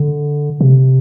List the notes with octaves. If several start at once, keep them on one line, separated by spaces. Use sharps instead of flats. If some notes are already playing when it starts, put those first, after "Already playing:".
Already playing: D3
C3